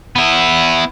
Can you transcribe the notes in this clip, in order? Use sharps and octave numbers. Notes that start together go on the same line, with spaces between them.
B3 E4